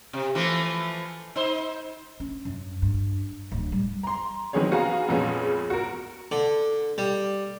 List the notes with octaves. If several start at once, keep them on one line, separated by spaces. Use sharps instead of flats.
C3
E3 F3 A3
D#4 C5
C#4
F#2
G2
D1
G3
A#5 C6
D#3 F#3 B3 C4 G#4 C#5
B3 F#4 G#4 F5 A#5
F2 A#2 G#3 B3 C#4
F#4 A#4
D3
G3